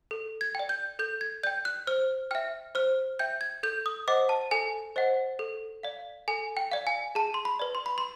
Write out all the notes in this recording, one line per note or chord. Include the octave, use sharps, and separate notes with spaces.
A4
G#6
D5 G5
G6
A4 G6
G#6
D5 G5 G6
F#6
C5 F6
E5 G5 F6
C5 F6
E5 G5 G6
G#6
A4 G6
D#6
C5 D#5 F#5 D6
A5
A4 G#5
C5 D#5 F#5
A4
D5 F5
A4 G#5
G5
D5 F5
G#5
G#4 A5
C6
B5
B4 D5
C6
B5
C6